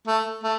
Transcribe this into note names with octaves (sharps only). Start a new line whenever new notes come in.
A3
A3